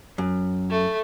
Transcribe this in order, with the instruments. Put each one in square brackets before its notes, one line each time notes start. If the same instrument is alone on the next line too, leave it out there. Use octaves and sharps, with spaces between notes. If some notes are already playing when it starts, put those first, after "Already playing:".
[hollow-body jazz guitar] F#2
[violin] A3